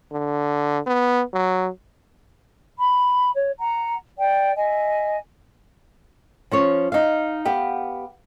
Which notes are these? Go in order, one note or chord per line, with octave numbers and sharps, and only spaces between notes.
D3
B3
F#3
B5
C#5
F#5 A#5
D5 G5
D#5 E5 G#5
F3 C#4 C#5
D#4 F5
B3 G4 F5